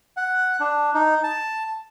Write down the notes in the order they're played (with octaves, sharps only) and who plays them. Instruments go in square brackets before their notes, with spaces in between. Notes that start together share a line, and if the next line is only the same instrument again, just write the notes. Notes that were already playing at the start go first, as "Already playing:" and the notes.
[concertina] F#5
D4
D#4
A5